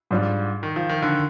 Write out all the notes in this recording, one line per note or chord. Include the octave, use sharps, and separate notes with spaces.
G#2 G3 D4 F4
D#3
F3
D#3
D3